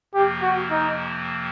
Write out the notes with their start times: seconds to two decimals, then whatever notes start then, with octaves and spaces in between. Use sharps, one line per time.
0.14 F2 C3 F3 A#3 G4
0.41 F#4
0.71 D#4